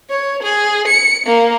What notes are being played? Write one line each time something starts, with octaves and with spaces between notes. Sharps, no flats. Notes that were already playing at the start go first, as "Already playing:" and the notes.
C#5
G#4
C#7
A#3